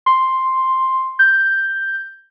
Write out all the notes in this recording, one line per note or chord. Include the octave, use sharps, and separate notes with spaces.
C6
G6